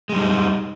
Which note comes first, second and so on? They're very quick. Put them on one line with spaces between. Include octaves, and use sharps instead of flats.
G#3 G3 D#4